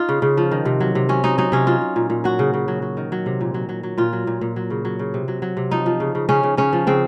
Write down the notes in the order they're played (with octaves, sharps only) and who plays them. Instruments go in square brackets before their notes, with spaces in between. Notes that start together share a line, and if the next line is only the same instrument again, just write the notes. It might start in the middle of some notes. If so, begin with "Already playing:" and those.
Already playing: [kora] D#4 F4
C#3
C#3
F3
D#3
C3
F#3
C3
F#3 C#4
F#3 D#4
F#3 D#4
C3 C#4
F#3 F4
F#3
A#2
A#2
F#3 F#4
C#3
C#3
F#3
F#3
D#3
F#3
C3
A#2
F#3
F#3
F#3
A#2 F4
F#3
A#2
A#2
F#3
C#3
F#3
C#3
C3
F#3
F#3
C3
F3 D#4
F3
C#3
C#3
C#3 C#4
C#3
C#3 C#4
F3
C#3 C4